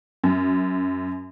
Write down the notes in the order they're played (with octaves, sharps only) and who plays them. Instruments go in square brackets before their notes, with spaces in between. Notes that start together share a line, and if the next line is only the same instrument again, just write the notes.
[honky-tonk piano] F#2